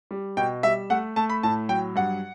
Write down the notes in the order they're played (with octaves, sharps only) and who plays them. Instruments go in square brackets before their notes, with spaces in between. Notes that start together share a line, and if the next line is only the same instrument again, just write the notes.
[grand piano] G3
B2 G5
G3 E5
A3 F#5
A3 A5
B5
A2 A5
F#3 G5
G2 F#5